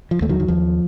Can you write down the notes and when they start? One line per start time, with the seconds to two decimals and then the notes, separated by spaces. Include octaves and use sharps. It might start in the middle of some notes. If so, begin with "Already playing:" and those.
0.11 F3
0.21 D#2 A3
0.29 D#3 F#3
0.40 D#3
0.48 D#2 F3